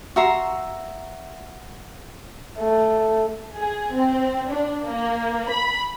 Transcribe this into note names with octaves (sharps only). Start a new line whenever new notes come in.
F#4 E5 A#5 C6
A3
G#4
C4
D4
A#3
B5